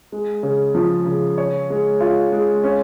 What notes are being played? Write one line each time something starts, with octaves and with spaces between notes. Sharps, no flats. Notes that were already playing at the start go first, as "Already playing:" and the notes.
G#3
C#3
F3
C#3
C#5
G#3
F4
G#3
C#4